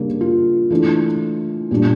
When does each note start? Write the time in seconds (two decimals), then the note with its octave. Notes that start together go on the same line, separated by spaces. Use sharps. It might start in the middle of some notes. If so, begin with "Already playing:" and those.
Already playing: C#3 G3 A#3 D4
0.21 F4
0.70 E3 A3 D4
1.71 A#2 G3 D4